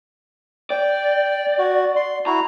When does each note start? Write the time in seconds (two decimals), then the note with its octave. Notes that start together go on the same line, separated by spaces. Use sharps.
0.70 D5 G5
1.59 F#4
1.96 C6
2.27 E4 F#4 A#5